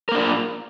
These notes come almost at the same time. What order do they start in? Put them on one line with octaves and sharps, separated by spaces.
A#4 A#3 D4 F4